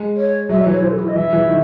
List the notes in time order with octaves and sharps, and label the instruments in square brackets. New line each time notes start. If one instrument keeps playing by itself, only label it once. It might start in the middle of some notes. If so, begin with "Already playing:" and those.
Already playing: [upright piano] G#3
[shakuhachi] C#5
[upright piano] F#3 [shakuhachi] E5
[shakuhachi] C#5
[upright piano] E3
[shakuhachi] C#5
[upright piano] E3 [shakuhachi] C5
[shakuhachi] A4
E4
D#5
[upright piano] E3 [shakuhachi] E5
[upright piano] E3
D#3